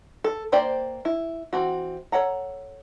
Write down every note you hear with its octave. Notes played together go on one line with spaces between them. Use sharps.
A4
A#3 C5 D5 G5
E4
E3 C4 F#4
A4 C#5 F#5 A#5